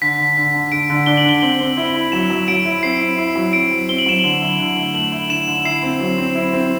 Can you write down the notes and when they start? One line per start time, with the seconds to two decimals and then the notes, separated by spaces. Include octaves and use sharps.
0.02 D3 B6
0.19 D3
0.37 D3
0.54 D3
0.72 D3 D7
0.90 D3
1.06 D4 G7
1.17 F#7
1.25 D3 G7
1.42 C4 F#7
1.60 C4
1.77 E4
1.95 E4
2.12 F#3 E7
2.30 F#3
2.48 F#3 D7
2.65 E4
2.83 C4 C7
3.01 E4
3.18 E4
3.36 F#3
3.53 C4 D7
3.71 F#3
3.89 C4 G7
3.98 F#7
4.06 F#3 E7
4.19 D3 F#7
4.41 E4
4.60 D3
4.77 A3
4.94 A3 F#7
5.12 E4
5.29 D3 E7
5.47 D3
5.65 E4 C7
5.83 C4
6.00 F#3
6.18 C4
6.35 E4
6.53 C4